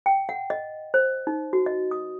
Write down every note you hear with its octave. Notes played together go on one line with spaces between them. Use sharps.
G5
F#5
D#5
C5
D#4
F#4
D#5
D#6